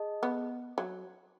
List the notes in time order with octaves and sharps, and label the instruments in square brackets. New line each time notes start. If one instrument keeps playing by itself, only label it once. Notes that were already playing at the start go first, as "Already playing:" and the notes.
Already playing: [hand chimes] G#4 D#5 A5
[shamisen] B3
F#3